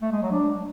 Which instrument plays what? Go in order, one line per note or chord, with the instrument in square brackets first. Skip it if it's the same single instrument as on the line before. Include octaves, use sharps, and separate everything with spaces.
[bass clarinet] A3
G#3
F#3
D4